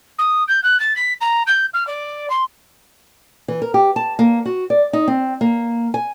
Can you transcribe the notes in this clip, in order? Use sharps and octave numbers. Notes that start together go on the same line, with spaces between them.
D#6
G6
F#6
A6
B6
A#5
G6
F6
D5
C6
E3
A#4
G4
A5
A#3
F#4
D5
D#4
C4
A#3
G#5